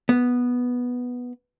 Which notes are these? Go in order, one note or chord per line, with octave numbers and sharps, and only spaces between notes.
B3